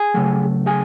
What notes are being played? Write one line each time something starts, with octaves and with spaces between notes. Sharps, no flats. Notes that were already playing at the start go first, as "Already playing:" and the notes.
Already playing: G#4 G#5
C#3 F#3 A3
G#4 G#5